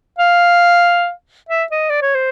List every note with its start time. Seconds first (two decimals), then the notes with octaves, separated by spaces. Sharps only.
0.19 F5
1.49 E5
1.72 D#5
1.90 D5
2.02 C#5
2.15 C5